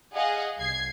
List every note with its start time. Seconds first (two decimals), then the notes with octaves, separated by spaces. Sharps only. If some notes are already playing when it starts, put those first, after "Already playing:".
0.14 G#4 D#5 F5 F#5
0.58 C2 G#6 C7